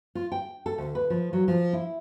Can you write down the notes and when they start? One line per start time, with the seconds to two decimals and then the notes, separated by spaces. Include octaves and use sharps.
0.15 F4
0.32 G5
0.66 A4
0.78 D2
0.95 B4
1.10 F3
1.33 F#3
1.48 F3
1.73 E4